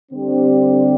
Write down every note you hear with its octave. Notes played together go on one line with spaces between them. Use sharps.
D3 G3 C4 D4 G4